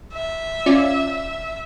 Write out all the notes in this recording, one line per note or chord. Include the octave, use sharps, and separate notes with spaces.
E5
C#4 F4 D5